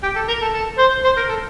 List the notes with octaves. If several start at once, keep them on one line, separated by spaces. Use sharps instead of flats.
G4
A4
A#4
A4
A4
C5
C5
A#4
A4